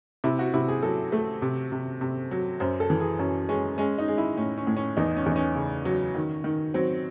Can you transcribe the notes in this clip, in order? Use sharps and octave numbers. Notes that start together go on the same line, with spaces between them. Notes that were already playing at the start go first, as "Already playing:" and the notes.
C3 E4
F#4
C3 E4
G#4
F#3 A4
A3
C3
C3
C3
F#3
F#2 C5
A4
E3
G#4
F#2 C#4
G#3 C#4
G#3 C#4
D#4
G#3
E4
A2 C#4
C#4
A2
C#4
E2 D#4
C#4
E2
D#4
C#4
C#3
F#3
D#3
D#3
F#3 C4